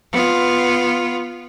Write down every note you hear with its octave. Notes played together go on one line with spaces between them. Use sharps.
B3 F4